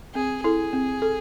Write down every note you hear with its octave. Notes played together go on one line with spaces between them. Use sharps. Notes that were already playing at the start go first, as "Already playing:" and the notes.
C4 G#4
E4 G#4 A4
C4
A4